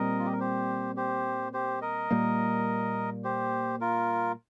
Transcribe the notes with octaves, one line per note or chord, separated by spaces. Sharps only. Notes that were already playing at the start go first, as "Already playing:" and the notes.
Already playing: A#2 G3 C4 A#4 D#5
F4
G4
A#4
G4 C5
G4 C5
G4 C5
A#4 D#5
A#2 G3 A#3
G4 C5
F4 A#4